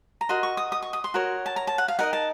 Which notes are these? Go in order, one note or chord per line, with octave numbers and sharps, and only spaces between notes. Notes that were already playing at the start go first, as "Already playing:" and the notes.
A#5
F#4 A#4 D#5 C6
C#6
D#6
D#6
C#6
D#6
C6
F#4 A#4 C#5
A5
A#5
A5
F#5
F5
D#4 A#4 D#5 F#5
A5